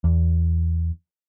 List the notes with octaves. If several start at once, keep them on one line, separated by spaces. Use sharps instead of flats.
E2